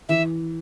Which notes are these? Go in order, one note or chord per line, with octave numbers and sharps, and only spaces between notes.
E3 E5